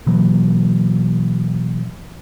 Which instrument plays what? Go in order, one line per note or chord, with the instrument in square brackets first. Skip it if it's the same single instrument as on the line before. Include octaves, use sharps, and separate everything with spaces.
[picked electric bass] B2 E3 F#3 A#3